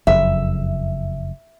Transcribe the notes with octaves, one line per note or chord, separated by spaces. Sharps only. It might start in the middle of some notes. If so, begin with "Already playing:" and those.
F#1 F2 E5